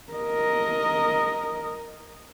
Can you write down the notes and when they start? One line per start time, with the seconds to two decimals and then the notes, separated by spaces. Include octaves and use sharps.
0.13 A#4 D#5